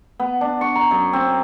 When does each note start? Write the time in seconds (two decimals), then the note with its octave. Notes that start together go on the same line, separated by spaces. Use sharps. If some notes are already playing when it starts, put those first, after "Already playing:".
0.20 B3
0.41 D4
0.61 C#6
0.76 A#5
0.91 F#2
1.13 C4